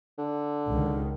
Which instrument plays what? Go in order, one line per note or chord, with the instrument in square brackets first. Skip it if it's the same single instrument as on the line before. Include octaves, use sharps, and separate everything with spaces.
[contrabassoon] D3
[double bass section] C#2 D#3